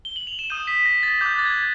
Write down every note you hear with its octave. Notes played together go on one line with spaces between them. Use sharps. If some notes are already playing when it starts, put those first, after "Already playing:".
G7
F#7
F7
E7
D#6 G6 D#7
B6
A#6
A6
D6 F#6 G6
A6
G#6